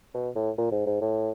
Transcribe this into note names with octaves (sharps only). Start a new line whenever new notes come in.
B2
A2
A#2
G#2
G#2
A2